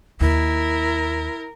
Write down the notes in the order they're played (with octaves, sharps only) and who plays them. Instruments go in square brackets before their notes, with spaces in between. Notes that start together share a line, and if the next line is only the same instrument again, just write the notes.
[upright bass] D#2 [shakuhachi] E4 [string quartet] A#4